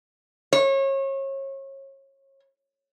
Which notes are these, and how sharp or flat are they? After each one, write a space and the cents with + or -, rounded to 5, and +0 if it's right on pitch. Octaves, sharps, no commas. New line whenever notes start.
C#5 -30